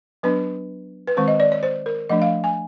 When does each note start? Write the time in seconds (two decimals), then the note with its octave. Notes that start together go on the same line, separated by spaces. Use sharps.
0.23 F#3 B3 D4 B4
1.08 B4
1.17 D#3 G#3 C4 C5
1.28 D#5
1.40 D5
1.52 C#5
1.63 C5
1.86 A#4
2.09 F3 A3 D4 D#5
2.22 F5
2.44 G#5